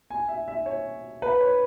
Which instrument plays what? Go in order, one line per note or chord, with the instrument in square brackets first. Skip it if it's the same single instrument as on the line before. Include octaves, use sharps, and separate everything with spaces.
[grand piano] G#5
E5
E5
C#5
B4
C#5